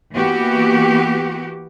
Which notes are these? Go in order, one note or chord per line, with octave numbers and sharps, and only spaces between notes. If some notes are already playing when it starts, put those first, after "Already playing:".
E3 A#3 B3 F#4 G4